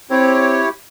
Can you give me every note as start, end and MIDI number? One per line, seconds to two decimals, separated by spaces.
0.11 0.60 60
0.11 0.69 64
0.11 0.69 67
0.11 0.69 73